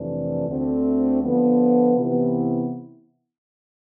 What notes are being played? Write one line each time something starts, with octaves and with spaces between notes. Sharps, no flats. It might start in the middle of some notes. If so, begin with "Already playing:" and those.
Already playing: F2 C3 E3 A3 D4
D2 D3 A3 C4
D3 F3 B3
C3 E3 B3 E4